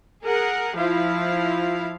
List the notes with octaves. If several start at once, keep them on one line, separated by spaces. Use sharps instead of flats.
G#4 A#4 F#5
F3 E4 F5